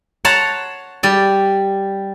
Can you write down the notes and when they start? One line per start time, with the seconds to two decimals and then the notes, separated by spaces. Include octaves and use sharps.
0.25 C#5 F#5 A5 A#5 C6
1.03 G3 D5